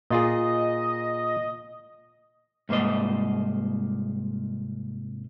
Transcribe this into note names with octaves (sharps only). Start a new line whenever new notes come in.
A#2 F4 G#4 D#5
C2 G#2 A#3 C5 D#5